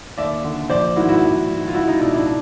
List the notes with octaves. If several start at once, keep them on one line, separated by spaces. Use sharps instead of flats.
D#2 D5 E5
D3
A#1 C5 D5
G#2 D#3 E4 F#4
E4 F#4
A#1
G#2 D#3
F4
C#2 E4 F#4
D#4 F4
B2 D4 E4
D4 E4
D4